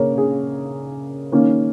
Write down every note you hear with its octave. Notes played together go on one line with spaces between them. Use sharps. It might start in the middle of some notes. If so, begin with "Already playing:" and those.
Already playing: C#3 A#3 C#4 G#4 A#4 C#5
G#4
D#3 A#3 C#4